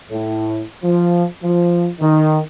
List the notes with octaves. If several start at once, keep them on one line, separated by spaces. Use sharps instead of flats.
A2
F3
F3
D#3